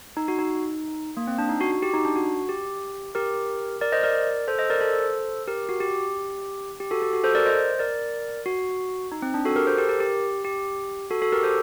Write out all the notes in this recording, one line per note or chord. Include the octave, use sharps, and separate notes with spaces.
D#4
F#4
D#4
A#3
C4
D4
D#4
F#4
F#4
G4
D#4
D4
F#4
G4
G4 A#4
A#4 D5
C5 D#5
A#4 D5
A4 C5
C5 D#5
A#4 D5
A4 C5
G4 A#4
F#4
G4
G4
F#4 A4
G4
F#4 A4
A4 C5
A#4 D5
C5 D#5
A#4 D5
F#4
D#4
C4
D4
F#4 A4
G4 A#4
A4 C5
G4 A#4
G4 A#4
G4
G4
F#4 A4
F#4 A4
G4 A#4
A4 C5